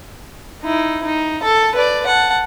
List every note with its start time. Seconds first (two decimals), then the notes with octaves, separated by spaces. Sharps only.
0.63 D#4 E4
1.04 D#4
1.42 A4 A5
1.75 B4 D5
2.06 F#5 A5